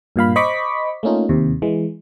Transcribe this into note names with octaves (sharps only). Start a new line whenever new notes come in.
G2 A#2 F5 B5
C5 D#5 B5 C#6 D6 B6
A3 A#3 C#4 D#4 F4
D#2 C3
E3 G#3